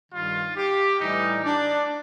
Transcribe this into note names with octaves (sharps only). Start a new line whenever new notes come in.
G2 D#3 G3 F4
G4
A2 E3 G3 D#4
D4